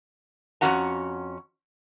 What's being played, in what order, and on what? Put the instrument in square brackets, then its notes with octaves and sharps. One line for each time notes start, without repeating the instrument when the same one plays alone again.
[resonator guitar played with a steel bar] F2 B2 C#4 F#4 F#5 A#5